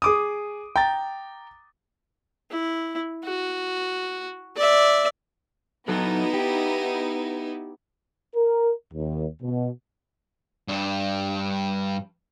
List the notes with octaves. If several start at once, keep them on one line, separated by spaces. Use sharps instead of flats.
G#4 D6 D#6
G5 A#5 A6
E4
F#4
D5 E5
F#3 B3 D#4 E4 F#4 A4
G4
A#4
D#2
B2
G2 D4